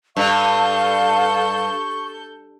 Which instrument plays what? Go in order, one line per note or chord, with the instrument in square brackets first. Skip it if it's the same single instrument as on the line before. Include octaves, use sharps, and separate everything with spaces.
[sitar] G2 [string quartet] A4 G6 [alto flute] F5 [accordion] C#6